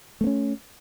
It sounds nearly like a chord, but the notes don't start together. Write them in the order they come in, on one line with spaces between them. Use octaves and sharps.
A3 B3 C#4